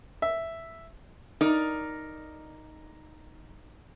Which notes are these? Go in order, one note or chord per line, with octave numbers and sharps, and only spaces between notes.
E5
D#4 A#4 D5